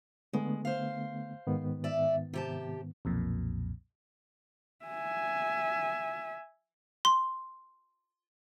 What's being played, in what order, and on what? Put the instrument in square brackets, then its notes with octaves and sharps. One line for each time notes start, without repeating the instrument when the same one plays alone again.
[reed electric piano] D3 A3 B3 [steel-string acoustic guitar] G#3
[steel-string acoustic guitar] C5 F5
[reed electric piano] G#2 D#3 B3
[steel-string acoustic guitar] D5 E5
C3 G4 A5
[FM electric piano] B1 F2 A#2
[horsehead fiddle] E5 G#5
[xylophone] C6